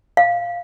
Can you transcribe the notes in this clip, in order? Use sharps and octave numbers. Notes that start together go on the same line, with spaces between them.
F5